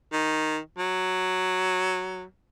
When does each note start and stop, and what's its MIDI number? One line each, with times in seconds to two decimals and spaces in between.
0.12 0.59 51
0.78 2.24 54